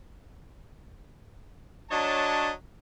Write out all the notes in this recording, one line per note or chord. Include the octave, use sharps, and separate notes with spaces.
F#3 D4 C#5 D#5 A5